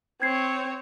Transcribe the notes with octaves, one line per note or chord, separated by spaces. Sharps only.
C4 C#5 G#6 C7